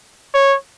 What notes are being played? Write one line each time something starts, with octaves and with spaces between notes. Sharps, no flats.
C#5